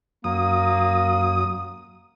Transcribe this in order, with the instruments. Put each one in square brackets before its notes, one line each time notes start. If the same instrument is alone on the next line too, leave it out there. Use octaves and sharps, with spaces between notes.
[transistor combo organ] F#2 D#6 [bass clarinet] A#3